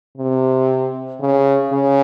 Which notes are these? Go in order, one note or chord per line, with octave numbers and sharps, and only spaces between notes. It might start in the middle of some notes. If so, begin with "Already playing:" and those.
C3
C#3
C#3